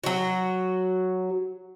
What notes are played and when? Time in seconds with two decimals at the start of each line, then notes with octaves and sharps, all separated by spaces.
0.04 F#3 F#4